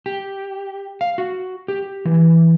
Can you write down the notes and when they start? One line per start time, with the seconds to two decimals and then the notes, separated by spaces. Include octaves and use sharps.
0.06 G4
1.01 F5
1.18 F#4
1.68 G4
2.05 E3